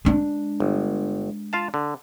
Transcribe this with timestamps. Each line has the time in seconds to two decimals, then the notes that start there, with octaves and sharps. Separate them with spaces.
0.05 G#3 D4
0.60 G1
1.53 F4 F5 A5
1.74 D3